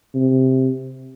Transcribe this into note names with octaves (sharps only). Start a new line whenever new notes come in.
C3